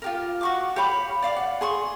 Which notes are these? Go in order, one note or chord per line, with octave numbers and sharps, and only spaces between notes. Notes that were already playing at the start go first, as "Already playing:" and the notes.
F4 G4 A#4
F#4 C#6 D6
G4 C#5 F5 B5
D5 F5 D6
F#5
G#4 C6 C#6